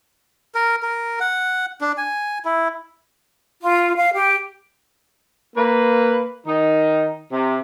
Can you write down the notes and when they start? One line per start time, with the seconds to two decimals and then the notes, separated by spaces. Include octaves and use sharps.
0.55 A#4
0.82 A#4
1.20 F#5
1.81 D4
1.98 G#5
2.45 E4
3.62 F4
3.96 F5
4.14 G4
5.56 A#3 B4
6.46 D#3 D#4
7.32 C3